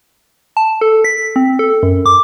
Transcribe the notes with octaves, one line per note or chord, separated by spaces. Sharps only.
A5
A4
B6
C4
A4
F#2
D6